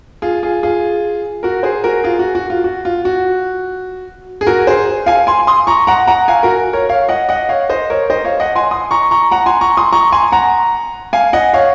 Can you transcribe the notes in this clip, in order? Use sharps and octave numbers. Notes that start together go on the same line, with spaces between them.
F4 G#4
F4 G#4
F4 G#4
F#4 A#4
G#4 C5
F#4 A#4
F4 G#4
F#4
F#4
F4
F#4
F4
F#4
G#4
F#4 A#4
G#4 C5
F5 G#5
G#5 C6
C6 D#6
A#5 C#6
F#5 A#5
F#5 A#5
F5 G#5
F#4 A#4
A#4 C#5
C#5 F5
D#5 F#5
D#5 F#5
C#5 F5
C5 D#5
A#4 C#5
C5 D#5
C#5 F5
D#5 F#5
G#5 C6
C6 D#6
A#5 C#6
A#5 C#6
F#5 A#5
G#5 C6
A#5 C#6
C6 D#6
A#5 C#6
G#5 C6
F#5 A#5
F5 G#5
D#5 F#5
C#5 F5